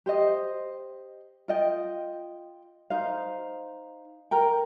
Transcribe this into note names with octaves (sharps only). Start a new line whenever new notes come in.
G4 C5 D#5
F4 D#5 G5
D#4 C5 F5
A#4 G5 A#5